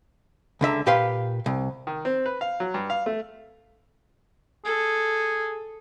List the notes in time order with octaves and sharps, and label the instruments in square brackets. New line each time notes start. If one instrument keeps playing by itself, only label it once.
[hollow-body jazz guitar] C#2 D3 E5 A#5
A#2 G4 B4 F5 C6
C2
[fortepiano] D#3
C4
B4
F5
F#3
G2
F5
A3
[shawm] G#4 [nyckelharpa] A4